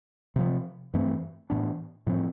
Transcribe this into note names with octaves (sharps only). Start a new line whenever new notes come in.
C3 F3 C4
G2 E3 A3 C4
A2 E3 B3 D4
A2 F3 C4